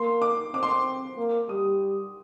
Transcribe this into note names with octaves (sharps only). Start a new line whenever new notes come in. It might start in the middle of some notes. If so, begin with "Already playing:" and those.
Already playing: A#3 C6
D6
C4 D6
C6
D6
A#3
G3 D#6